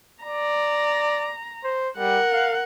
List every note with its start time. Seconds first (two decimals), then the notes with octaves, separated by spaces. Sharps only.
0.23 D5 A#5
1.64 C5
1.98 G3 A#4 F#5
2.33 F5